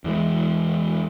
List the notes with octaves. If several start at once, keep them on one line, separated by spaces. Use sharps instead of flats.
E2 E3 G#3